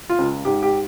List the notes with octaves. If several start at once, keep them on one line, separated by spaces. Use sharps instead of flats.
F4
C#2
G#2 G4
G4